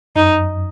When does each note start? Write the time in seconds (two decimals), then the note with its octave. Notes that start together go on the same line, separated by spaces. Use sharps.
0.16 F#2 D#4